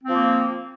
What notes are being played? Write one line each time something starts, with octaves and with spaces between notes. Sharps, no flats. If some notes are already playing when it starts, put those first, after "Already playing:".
F3 A#3 C4